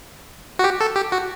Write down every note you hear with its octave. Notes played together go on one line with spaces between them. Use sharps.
F#4
G4
A4
G4
F#4